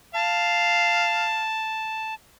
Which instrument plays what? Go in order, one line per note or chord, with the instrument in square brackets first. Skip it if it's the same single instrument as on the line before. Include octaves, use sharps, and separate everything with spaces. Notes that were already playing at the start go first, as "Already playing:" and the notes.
[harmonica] F5 [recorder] A5